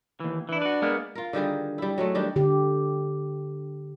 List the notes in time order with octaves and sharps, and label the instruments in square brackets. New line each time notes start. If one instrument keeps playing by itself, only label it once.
[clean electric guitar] D#2 E3
[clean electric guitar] E3 E4 [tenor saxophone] D4
[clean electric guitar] F#4 B4
G#3 A#3 B3
[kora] F4 A#4
D3 D#3 G3 G#4
G3 E4
F#3 G#3 A3
D#3 G3 D4
[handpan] D3 G4